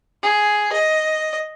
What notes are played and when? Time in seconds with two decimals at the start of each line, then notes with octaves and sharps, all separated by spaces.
0.23 G#4
0.73 D#5